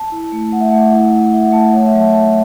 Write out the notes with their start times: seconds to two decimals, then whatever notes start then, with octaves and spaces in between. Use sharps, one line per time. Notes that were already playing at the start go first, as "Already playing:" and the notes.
Already playing: A5
0.12 E4
0.32 A3
0.52 A3 F#5
0.61 E5
0.69 A3 F#5
0.92 E4
1.13 E4
1.33 E4 E5
1.43 F#5
1.53 A3 A5
1.63 F#5
1.73 A3 C#5
1.87 E5
1.93 F#3
1.99 A5
2.13 F#3 A5